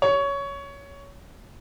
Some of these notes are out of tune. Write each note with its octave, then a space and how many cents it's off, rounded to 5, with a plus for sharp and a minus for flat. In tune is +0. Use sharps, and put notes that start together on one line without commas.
C#5 +15